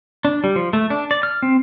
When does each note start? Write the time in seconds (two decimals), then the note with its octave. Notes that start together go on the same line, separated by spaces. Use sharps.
0.25 D4
0.44 G3
0.56 F3
0.73 A3
0.90 D4
1.11 D5
1.23 F6
1.42 C4